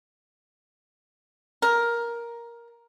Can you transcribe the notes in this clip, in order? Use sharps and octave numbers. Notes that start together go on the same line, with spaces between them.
A#4